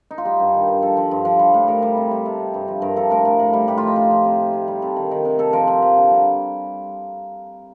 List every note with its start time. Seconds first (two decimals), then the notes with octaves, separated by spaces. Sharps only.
0.11 D#4
0.18 F4
0.25 G3 G4
0.40 G2
0.54 D#3
0.68 G2
0.82 F3 A4
0.97 F3
1.11 G2
1.25 F3
1.39 G3
1.54 A2
1.68 G3 A#4
1.82 G3
1.97 C3
2.11 G3
2.25 C3 A4
2.40 C3
2.54 G2
2.68 F3
2.82 G2 A#4
2.96 F3 A4
3.10 A2 A#4
3.25 A2
3.39 A2
3.53 G3
3.68 A2 G4
3.78 F4
3.83 F3 D#4
3.96 F3 F4
4.11 F3
4.25 C3
4.40 C3
4.53 C3
4.68 G3
4.82 C3 A4
4.96 D#3
5.11 D#3
5.25 C3
5.39 C3 A4
5.53 F3 A#4
5.68 F3
5.82 F3
5.97 D3
6.10 G3